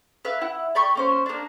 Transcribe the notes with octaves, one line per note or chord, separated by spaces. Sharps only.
B4 E5 F5
E4 F#5
D5 G5 B5 C#6
A#3 C#4 C5
A#3 D4